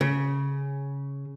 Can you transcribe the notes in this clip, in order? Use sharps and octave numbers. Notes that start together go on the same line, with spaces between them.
C#3